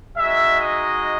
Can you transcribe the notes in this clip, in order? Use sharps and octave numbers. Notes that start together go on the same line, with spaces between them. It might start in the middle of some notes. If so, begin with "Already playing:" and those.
G#3 D#4 F#4 E5
D#5